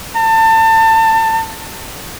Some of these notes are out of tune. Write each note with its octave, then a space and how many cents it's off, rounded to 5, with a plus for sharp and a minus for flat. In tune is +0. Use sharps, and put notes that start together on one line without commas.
A5 +30